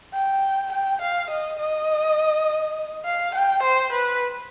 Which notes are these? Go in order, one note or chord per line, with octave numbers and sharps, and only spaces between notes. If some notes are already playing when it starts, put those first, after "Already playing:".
G5
G5
F5
D#5
D#5
F5
G5
C5
B4